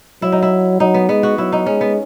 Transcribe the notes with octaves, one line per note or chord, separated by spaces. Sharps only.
F#3 E4
D#4
E4
F#3 D#4
B3
G#3 B3
F#4
F#3 E4
D#4
G#3 C#4
B3